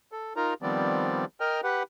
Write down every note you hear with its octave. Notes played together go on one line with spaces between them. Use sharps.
A4
D#4 F4 A#4 A#5
D#3 F3 G3 B3 C4 D5
A#4 D#5 G5 F6
G4 B4 F#5